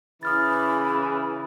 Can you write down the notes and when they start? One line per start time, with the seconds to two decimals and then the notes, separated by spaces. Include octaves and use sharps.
0.23 C#3 E3 B5 D#6 F6 A6